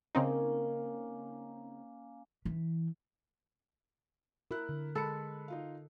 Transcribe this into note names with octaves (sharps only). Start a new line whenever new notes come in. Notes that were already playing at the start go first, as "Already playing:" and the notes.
C#3 A#3 C4 C#4 D#4
E3
E4 A#4 F#6
D3
G#3 A4 B5 C#7
D#4 F4 F5